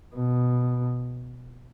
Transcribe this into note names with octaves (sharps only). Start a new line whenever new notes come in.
B2